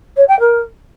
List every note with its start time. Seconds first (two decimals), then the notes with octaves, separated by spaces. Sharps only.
0.17 C#5
0.28 G5
0.40 A#4